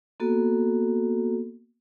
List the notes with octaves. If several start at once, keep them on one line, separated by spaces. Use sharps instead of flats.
A#3 B3 F#4 A4